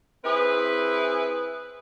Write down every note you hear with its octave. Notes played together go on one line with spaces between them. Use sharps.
C4 E4 G#4 B4